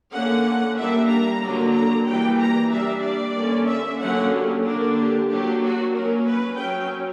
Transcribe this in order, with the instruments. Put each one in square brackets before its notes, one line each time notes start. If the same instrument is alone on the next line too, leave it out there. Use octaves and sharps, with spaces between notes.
[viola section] D3 A#3 C#4 F#5
G3 A#3 D4 E5
A#5
D3 F#3 A#3 D4
A#5
E3 G3 A#3 G5
A#5
G3 A#3 D4 E5
D5
D3 A#3 C#4
E5
D3 F#3 A#3 C#4 F#5
G4
D3 A#3 D4 A#4
G4
F#3 A#3 D4 G4
F#4
F#3 A#3 C#4 A#4
B4
F#3 C#4 G5